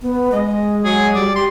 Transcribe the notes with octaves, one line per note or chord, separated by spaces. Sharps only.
B3
G#3 D#5
F#3 G#4
G3 D5
G4 C6